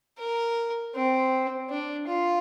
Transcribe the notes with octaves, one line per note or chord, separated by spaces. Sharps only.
A#4
C4
D4
F4